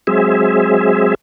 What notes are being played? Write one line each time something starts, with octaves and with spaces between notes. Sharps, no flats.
F#3 G#3 C4 G#4 E5